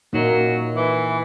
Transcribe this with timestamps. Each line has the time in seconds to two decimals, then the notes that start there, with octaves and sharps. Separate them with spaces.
0.13 F#2 A#2 F#3 A#3 D#4
0.75 E3